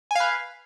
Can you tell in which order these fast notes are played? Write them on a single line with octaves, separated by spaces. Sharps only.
G#5 F5 B4